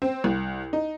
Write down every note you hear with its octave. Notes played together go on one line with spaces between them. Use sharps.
C4
C2
D#4